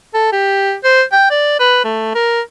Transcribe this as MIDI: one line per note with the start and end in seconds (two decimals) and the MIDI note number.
0.14 0.32 69
0.32 0.74 67
0.84 1.02 72
1.12 1.28 79
1.30 1.58 74
1.59 1.80 71
1.84 2.12 57
2.15 2.41 70